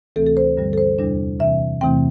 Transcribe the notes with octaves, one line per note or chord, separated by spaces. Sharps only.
D2 C3 E3 A3 C4 A4
A4
C5
G2 D3 G3
A4
C5
E2 C3 G3 D4
C3 E3 C4 E5
E2 C3 E3 A3 C4 G5